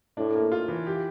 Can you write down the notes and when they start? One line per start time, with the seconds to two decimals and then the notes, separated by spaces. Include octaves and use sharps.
0.17 A2 D4
0.35 A#3
0.52 F4
0.68 E3
0.86 G4